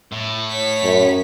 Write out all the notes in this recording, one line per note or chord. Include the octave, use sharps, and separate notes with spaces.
A2
C#5 B6
F#2